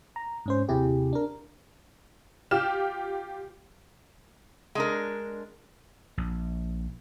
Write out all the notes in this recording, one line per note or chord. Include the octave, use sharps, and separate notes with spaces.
A#5
G#2 C#4 C5
D#2 C3 E4 G4 G#4
D4 A#4
F4 G4 F6 E7
G#3 D4 A#4
A#1